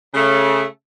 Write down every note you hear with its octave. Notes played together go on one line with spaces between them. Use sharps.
C#3 A3